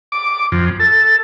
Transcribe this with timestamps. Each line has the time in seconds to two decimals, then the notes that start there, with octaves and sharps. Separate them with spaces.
0.12 D6
0.52 F2
0.80 A4